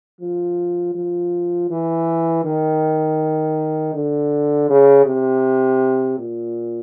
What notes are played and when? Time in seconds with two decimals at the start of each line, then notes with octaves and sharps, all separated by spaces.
0.21 F3
0.95 F3
1.70 E3
2.45 D#3
3.94 D3
4.69 C#3
5.06 C3
6.19 A#2